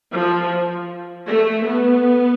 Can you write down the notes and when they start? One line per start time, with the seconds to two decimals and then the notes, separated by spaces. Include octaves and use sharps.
0.12 F3
1.27 A3
1.66 B3